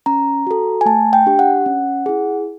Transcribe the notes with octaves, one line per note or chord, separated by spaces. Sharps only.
C#4 A#5
F#4 A4
G#5
A3 A5
G5
D4 G4
F#5
C#4
E4 G#4